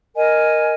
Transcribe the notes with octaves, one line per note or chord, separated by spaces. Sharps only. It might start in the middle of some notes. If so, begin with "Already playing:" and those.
A#4 D#5 G#5